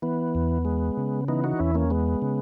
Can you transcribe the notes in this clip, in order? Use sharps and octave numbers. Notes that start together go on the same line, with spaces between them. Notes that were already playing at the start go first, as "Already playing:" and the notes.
E3 B3
E2
G#3
C#3
E3 B3 D#4
D#4 F#4
E2 C#4 E4
A#3 C#4
G#3 B3
C#3